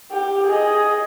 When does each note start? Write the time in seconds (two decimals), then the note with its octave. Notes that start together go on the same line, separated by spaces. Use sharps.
0.12 G4
0.47 G#4 D#5